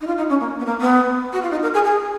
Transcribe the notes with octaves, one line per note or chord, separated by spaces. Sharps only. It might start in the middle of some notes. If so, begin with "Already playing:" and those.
D#4
F4
D#4
C#4
A#3
B3
A#3
B3
F#4
F4
D#4
A#4
G#4
G#4